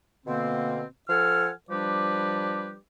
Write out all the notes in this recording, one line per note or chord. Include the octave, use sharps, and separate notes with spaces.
B2 D3 A#3 C4
F3 A4 F#5 G#5 F6
F3 G3 D4 G4 B4 D5